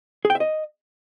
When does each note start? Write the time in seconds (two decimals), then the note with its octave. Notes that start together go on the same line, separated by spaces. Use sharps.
0.25 G#4
0.30 G5
0.35 E5
0.40 D#5